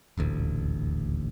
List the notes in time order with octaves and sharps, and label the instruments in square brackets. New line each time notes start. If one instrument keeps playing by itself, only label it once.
[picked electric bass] D#1 A1 D2